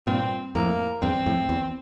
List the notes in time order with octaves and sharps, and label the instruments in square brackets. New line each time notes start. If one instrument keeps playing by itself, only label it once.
[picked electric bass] G2 A#2 [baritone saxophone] C4
[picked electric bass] F2 A2 [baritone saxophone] A#3
[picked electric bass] E2 G2 [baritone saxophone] C4
[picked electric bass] F2 A2
E2